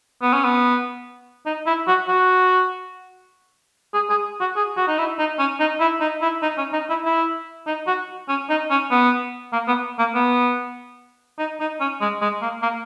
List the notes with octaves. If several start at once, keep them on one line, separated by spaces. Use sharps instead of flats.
B3
C#4
B3
D#4
E4
F#4
F#4
G#4
G#4
F#4
G#4
F#4
D#4
E4
D#4
C#4
D#4
E4
D#4
E4
D#4
C#4
D#4
E4
E4
D#4
F#4
C#4
D#4
C#4
B3
A#3
B3
A#3
B3
D#4
D#4
C#4
G#3
G#3
A#3
A#3